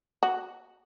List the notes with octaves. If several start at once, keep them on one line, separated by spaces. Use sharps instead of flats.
F#4